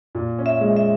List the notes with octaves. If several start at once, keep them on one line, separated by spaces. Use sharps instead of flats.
A#2
C#4
E5
G#3
E5